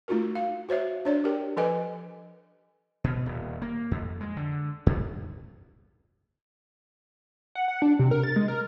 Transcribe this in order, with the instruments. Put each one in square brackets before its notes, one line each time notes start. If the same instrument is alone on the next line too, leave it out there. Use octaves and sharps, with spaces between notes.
[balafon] A3 D#4 F4 F#4 A#4
F5
F#4 C5 C#5 E5
D4 C#5 D5
G4 A#4 G5
F3 A4 B4 D#5 G#5 D6
[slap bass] B2
D#1
A#3
F2
G#3
D3
F2
[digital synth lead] F#5
F#5
D4
C3
A#4
A6
G#3
A#4